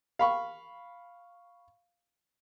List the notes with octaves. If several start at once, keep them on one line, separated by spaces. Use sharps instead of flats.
F5 B5 C#6